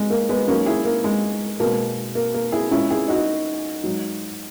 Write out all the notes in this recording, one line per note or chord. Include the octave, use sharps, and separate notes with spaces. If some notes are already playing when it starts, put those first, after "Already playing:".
Already playing: G#3
A#3
G#3 B3
G#2 F#3 A#3 C#4
E4 G#4
A#3
G#3
B2 G#3 A#3
A#3
A#3
E4 G#4
A#2 G#3 C#4 E4
E4 G#4
D#4 F#4
G#2 F#3